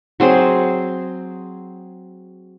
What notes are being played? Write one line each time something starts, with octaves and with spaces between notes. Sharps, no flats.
F#3 C4 G#4 C5